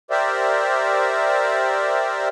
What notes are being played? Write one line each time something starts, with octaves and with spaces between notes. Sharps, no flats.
G4 A#4 C5 D5 E5